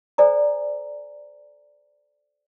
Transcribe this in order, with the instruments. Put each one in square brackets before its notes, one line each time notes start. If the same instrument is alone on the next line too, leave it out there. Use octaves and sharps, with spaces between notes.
[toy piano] A4 C5 D5 G#5 A#5